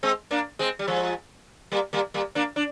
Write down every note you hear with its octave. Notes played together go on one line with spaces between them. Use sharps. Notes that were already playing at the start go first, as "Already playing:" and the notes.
G#3 C4
A#3 D4
G#3 C4
G3
F3 G#3
G3 A#3
G3 A#3
G3 A#3
A#3 D4
D4